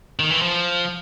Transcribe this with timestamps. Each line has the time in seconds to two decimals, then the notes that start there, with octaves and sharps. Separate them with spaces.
0.19 D#3
0.30 E3
0.42 F3